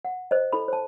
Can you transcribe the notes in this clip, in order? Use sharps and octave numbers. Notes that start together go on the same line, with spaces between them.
F#5
C5 D#5
E4 A4 B5
C5 A5